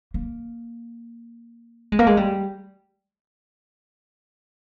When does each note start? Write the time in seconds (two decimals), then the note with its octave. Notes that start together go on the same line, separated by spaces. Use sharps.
0.14 A#3
1.92 G#3
1.99 A#3
2.07 G#3
2.17 G3